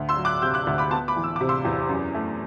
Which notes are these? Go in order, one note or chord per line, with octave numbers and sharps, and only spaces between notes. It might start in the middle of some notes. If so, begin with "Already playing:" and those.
Already playing: D2
C6 E6
F#3
D6 F#6
C3 E6 G6
D6 F#6
D2
B5 D6
B3 A5 C6
B5 D6
E3
E6
C3 D6
C6 E6
E2
F#2
A3